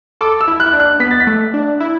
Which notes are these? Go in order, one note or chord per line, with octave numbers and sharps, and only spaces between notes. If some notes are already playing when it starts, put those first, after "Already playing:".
A4 D6
E6
E4
F#6
E4
D4
F#6
B3 B6
A6
B6
A3
D4
E4